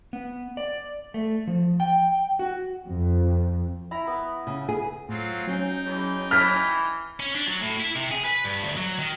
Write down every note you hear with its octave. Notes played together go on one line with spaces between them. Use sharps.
B3
D5
A3
F3
G5
F#4
F2
E4 A#5 B5
B3
C#3
G#4
A2 F#3 C4 F4 C7
F#3 C#4 D#4 G5
E2
E3 F6 B6
C#4
D4
F#3
A2
E4
C3
G#4
B4
G2
D2
F#3
D#3